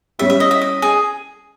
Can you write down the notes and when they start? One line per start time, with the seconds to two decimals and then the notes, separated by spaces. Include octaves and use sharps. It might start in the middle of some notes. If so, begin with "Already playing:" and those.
0.19 G3 C#4 E4 G4 E5
0.30 E5
0.40 D#5
0.51 E5
0.61 D#5
0.82 G#4